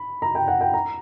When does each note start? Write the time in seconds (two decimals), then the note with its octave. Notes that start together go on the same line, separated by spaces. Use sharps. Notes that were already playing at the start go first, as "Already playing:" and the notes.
Already playing: B5
0.22 A#5
0.35 G5
0.48 F#5
0.61 G5
0.74 A#5